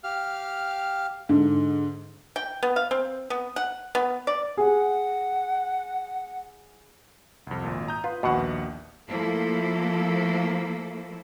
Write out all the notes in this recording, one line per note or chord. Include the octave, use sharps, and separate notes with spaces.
G4 F5 F6
G#2 D3
G5
B3
F5
C4
B3
F#5
B3
D5
G#4 F#5
C2 F2
G#1 A#2
A#5 D#6 G6
F4 B4
A#1 D#2 B2 F#5
F3 A3 A#3 E4 A4